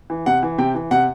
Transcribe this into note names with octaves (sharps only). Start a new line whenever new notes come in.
E3
C3 F#5
E3
C3 G5
E3
C3 F#5